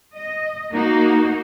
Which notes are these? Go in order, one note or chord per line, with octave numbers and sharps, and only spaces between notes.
D#5
A#3 D#4 F#4